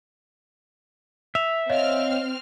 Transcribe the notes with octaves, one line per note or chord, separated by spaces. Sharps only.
E5 F7
C4 C#5 D#5 F5 F6